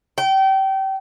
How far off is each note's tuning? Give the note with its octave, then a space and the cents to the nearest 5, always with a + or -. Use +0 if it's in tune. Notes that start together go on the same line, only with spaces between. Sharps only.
G5 -30